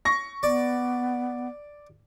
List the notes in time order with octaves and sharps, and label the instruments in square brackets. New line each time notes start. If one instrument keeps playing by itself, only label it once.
[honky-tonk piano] C#6 A#6
[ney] B3 [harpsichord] D5